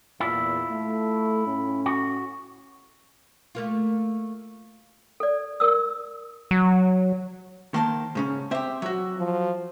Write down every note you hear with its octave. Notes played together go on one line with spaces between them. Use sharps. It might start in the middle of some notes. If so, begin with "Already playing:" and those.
E2 A#2 E4 F4
A3
A2 C#4
F#4
A3 A#3 F4
A4 D5
A#4 D5 D#6 E6
F#3
D#3 A#3 C5 A5 C6
G#2 C#3 C#4
C4 G4 C5 E5
F#3 F#4 E5
F3